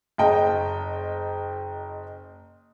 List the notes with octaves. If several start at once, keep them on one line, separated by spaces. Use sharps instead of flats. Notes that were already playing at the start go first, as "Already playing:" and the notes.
F#1 D#5 G5